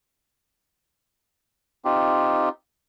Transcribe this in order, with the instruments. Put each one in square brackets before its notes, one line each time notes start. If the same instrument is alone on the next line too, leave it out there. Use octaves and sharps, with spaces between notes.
[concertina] C4 D#4 F4 G4